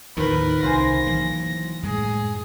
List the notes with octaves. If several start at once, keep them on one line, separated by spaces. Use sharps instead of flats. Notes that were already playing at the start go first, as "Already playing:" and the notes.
D#2 A2 D#3 F3 A#4 B4
C2 C#3 F4 C5 G#5 A#6
E3 F#3 A#3
F#2 A2 G#3 G#4